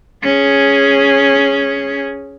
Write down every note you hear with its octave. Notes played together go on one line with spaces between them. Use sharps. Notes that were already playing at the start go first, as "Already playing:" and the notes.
C#4 G#4